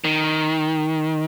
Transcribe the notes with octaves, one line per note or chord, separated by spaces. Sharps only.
D#3